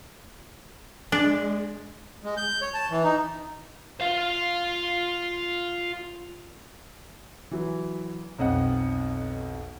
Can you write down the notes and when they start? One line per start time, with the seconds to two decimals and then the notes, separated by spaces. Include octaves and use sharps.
1.12 G#3 D4
2.24 G#3
2.37 G6
2.61 C#5
2.74 A5
2.91 E3
3.04 D#4
4.01 F4 F5
7.51 E3 F#3
8.39 B1 F2 D#5 F#5